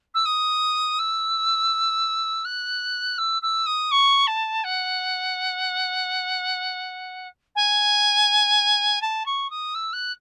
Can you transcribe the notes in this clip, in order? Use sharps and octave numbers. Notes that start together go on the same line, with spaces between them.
E6
D#6
E6
F#6
E6
E6
D#6
C#6
A5
F#5
G#5
A5
C#6
D#6
E6
F#6